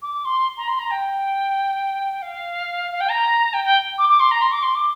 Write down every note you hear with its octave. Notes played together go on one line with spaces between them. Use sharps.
D6
C6
A#5
C6
A#5
G5
F5
F5
G5
A#5
G5
G5
D6
D6
C6
A#5
C6
D6
C6
D6